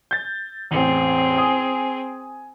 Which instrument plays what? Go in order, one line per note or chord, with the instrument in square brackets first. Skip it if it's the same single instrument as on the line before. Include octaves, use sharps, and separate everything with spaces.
[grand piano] G6 A6
[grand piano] A1 E2 [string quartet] C4 G#4
[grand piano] G#5 D#6